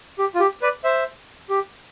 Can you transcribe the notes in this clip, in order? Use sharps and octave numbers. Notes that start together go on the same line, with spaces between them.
G4
F4
G4
B4 D5
C5 E5
G4